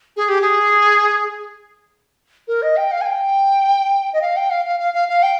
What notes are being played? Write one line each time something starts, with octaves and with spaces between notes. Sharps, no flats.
G#4
G4
G#4
A#4
D#5
G5
F5
G#5
G5
D#5
F5
G5
F5
F5
F5
F5
F5
G5